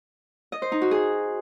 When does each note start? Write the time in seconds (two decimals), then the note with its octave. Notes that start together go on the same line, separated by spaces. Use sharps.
0.52 D#5
0.62 C5
0.72 D#4
0.82 F#4
0.91 G#4